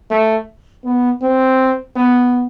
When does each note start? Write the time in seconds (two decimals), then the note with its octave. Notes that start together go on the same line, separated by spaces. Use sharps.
0.11 A3
0.84 B3
1.22 C4
1.96 B3